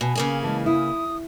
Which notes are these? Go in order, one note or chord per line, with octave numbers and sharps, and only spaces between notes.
B2 G#5
C#3 A#3 G#4
E3 G#3 A5
E4 D#6